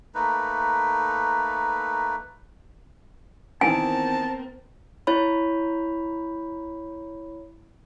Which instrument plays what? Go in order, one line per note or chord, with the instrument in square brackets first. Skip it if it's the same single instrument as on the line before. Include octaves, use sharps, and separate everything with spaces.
[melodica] A3 A#3 D#4 B4
[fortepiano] D#3 E3 [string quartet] B3 C4 A#4 [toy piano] G#5 [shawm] A5
[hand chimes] E4 C#5 B5